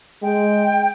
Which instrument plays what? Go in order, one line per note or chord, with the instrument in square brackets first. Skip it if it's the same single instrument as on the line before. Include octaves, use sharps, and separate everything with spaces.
[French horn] G#3 [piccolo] G5